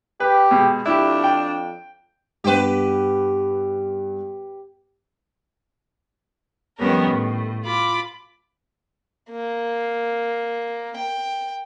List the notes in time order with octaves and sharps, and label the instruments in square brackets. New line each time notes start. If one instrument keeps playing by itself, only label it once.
[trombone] G4 [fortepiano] B4
[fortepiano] B2 G#3
[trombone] F2 [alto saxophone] D4 [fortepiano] E4 G4
[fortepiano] G5
[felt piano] G2 B3 [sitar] G4 B4
[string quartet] F2 D#3 G3 B3 C#4 A#4
A2
F4 B5 D6
[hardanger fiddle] A#3
G5